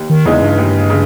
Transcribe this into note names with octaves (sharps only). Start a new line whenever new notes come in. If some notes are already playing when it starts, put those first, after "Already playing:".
Already playing: D#2
D#3
E2 C#3 E3 G#3 D#4
G2
D#2
C#3